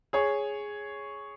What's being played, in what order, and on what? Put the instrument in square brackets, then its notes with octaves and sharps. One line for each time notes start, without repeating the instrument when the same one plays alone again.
[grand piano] G#4 C#5